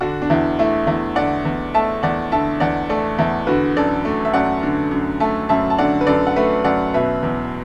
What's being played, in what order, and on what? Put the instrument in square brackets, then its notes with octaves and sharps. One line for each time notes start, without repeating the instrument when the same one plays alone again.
[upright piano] D3 D4 F#4
D4
E2 E4
A3 E4
E2 E4
D3 D5 F#5
E2
A3 E5 A5
E2 D5 F#5
D3 E5 A5
E2 D5 F#5
A3 A4 D5
E2 E4 A4
D3 F#4 B4
F#2 A4 D5
A3
E5
F#2 D5 F#5
D3
F#2
A3 E5 A5
F#2 E5 A5
A5
D3 D5 F#5
B4
F#2 A4 D5
F#5
A3 B4 E5
F#2 D5 F#5
B2 B4 E5
E2